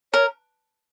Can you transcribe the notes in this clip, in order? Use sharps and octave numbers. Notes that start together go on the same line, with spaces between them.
A#4 C#5